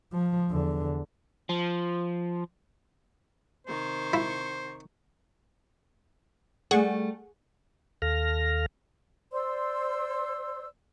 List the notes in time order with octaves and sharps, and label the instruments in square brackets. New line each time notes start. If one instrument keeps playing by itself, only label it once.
[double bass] F3
E2 D3
[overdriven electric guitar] F3
[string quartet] C3 D#3 C#6 [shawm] C5
[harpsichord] E4
[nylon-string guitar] G3 A3 [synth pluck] G#4 F#5 C#6
[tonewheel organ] D#2 A4 F5 F6 A#6
[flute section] C5 D5 C6 E6